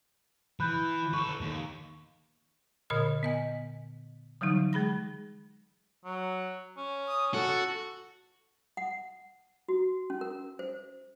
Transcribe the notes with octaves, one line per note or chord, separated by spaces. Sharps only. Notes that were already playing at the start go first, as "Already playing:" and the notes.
E3 B5 F#6 G6
A4 B4 C#6
D#2
A#2 D3 A#4 D#5 F6
B3 D#5 G#5
D3 E3 F#3 G3 D#4
G#3 G#4 B5 A#6
F#3
C#4
D#6
F#4 A4
F#5
F#4
C#4
A#4
C5